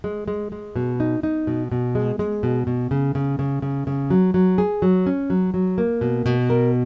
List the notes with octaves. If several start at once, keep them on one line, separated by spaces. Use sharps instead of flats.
G#3
G#3
G#3
B2
D#4
D#4
B2
B2
G#3
G#3
B2
B2
C#3
C#3
C#3
C#3
C#3
F#3
F#3
G#4
F#3
C#4
F#3
F#3
A#3
B2
B2
A#4